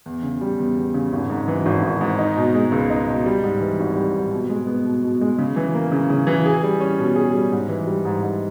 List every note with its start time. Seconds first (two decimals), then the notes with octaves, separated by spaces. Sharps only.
0.06 E2
0.23 C#3
0.41 G3
0.58 E2
0.76 E2
0.94 C#3
1.13 G#1
1.30 G#2
1.48 E3
1.66 G#1
1.83 G#1
2.01 G#2
2.19 D#4
2.36 B2
2.54 G#3
2.72 C#2
2.90 D#4
3.08 B2
3.26 G3
3.44 G#2
3.61 E3
3.79 G#1
3.96 G3
4.14 G#2
4.32 B2
4.49 G#3
4.67 B3
4.85 B2
5.03 B2
5.21 G#3
5.38 C#3
5.56 E3
5.74 A#3
5.92 C#3
6.10 C#3
6.27 E3
6.46 G#4
6.63 G3
6.80 C#4
6.99 B2
7.16 G#4
7.34 G3
7.52 G#2
7.69 E3
7.87 G3
8.05 G#2
8.22 G#2